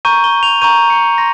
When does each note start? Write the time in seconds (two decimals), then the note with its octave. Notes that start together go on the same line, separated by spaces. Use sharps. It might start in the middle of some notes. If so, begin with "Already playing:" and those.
0.05 A#5 C#6 G6 D#7
0.24 G7
0.43 F7
0.61 A#5 C#6 G6 D#7
0.90 C#7
1.18 C6 A#6